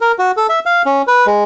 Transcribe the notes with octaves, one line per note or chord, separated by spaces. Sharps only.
A#4
F#4
A4
E5
F5
C#4
B4
G#3